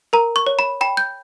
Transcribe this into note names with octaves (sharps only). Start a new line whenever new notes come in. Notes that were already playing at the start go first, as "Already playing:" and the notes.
A#4 A#5
C#6
C#5
B5
G5 B5
G6